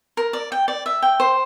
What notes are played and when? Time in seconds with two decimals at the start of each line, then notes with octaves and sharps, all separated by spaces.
0.17 A#4
0.33 D5
0.52 G5
0.68 D5
0.86 E5
1.02 G5
1.20 C5